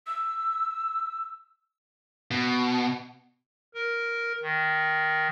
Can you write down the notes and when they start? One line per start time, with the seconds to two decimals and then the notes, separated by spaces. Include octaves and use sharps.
0.07 E6
2.31 B2
3.75 A#4
4.43 D#3